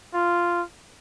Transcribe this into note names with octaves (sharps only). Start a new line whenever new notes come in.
F4